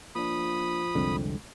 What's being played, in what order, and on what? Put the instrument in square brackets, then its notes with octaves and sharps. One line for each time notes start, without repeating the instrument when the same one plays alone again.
[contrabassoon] F3 [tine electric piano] A#3 D4 [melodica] B5 D#6
[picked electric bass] C2 F2 D3 [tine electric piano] G#3 C4